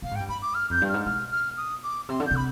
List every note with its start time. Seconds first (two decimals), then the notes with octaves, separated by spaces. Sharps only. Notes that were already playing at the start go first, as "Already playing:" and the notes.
0.02 B2 F5
0.11 G#2
0.15 G5
0.20 G2
0.28 G#2 B5
0.42 D6
0.54 F6
0.70 F2 G6
0.82 G2
0.89 G#2 F6
1.06 B2 F6
1.32 F6
1.57 D#6
1.83 D6
2.09 C3 C6
2.20 D3
2.26 C3 G6
2.36 B5